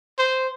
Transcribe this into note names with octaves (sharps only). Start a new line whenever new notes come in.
C5